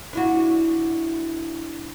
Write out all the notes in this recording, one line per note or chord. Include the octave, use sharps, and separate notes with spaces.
D4 E4 F#4